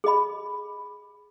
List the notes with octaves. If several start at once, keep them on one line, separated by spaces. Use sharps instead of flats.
G#4 D#5 B5